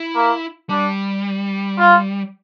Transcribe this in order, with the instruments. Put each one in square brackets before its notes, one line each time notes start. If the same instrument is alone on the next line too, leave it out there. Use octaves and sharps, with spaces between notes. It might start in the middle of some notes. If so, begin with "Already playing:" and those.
Already playing: [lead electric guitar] E4
[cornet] A#3
[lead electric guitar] G3 [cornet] D4
[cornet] F4